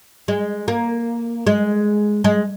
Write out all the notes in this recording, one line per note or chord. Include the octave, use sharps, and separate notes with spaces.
G#3
A#3
G#3
G#3